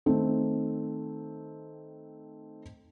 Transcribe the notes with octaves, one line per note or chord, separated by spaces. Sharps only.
D#3 A3 C4